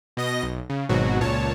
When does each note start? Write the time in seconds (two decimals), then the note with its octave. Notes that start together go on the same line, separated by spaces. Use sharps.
0.17 B2 D#5 A#6
0.43 B1
0.69 C#3
0.89 G#1 G#2 B2 F#3 F#4
1.20 C#2 A#2 C#5 A5